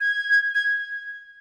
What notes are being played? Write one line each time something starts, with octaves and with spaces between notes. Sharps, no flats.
G#6
G#6